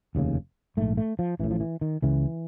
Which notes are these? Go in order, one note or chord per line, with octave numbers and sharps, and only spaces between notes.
F1 D#2 C#3
A#1 G#2 A3
A3
F3
A1 A2 E3
F3
E3
D#3
C#2 C#3 E3